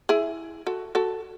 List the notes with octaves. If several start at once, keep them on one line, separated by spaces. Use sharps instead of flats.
E4 G#4
F#4 A4
F#4 A4